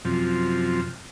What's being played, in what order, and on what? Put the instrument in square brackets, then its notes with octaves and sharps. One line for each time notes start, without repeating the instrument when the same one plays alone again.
[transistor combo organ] F#2 C3 F3